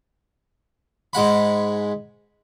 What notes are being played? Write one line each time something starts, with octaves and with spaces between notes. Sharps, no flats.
G#2 G#3 F#5 B5